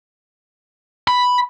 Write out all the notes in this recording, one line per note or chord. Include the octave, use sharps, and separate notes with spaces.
B5